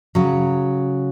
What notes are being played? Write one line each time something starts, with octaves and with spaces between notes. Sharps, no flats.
C#3 F#3